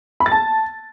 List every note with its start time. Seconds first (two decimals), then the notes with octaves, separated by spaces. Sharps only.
0.20 B5
0.26 A6
0.32 A5